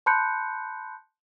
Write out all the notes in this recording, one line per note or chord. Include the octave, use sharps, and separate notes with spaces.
A5 B5 C6 F#6 G6 C#7